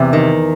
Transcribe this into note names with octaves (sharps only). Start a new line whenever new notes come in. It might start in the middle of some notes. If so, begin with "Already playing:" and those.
Already playing: E2 C3
D#3